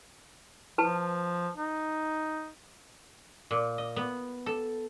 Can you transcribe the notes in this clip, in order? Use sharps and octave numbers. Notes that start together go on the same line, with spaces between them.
F3 B4 A5
D#4
A#2
D#5
B3
A4